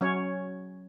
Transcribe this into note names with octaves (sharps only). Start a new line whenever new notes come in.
F#3 C#4 C#5